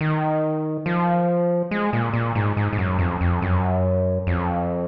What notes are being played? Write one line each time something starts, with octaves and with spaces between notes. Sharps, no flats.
D#3
F3
G#3
A#2
A#2
G#2
G#2
G#2
F#2
F2
F2
F#2
F2